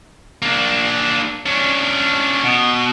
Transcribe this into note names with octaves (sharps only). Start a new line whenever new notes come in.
A#3 D4
C#4 D4
B2